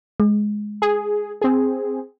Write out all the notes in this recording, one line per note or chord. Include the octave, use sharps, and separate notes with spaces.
G#3
G#4
C4 G#4